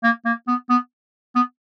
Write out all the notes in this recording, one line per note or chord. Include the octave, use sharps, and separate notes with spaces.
A#3
A#3
B3
B3
B3